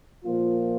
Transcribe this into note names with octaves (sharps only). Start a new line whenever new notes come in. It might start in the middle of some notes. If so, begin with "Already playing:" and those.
A#2 F3 A#3 F4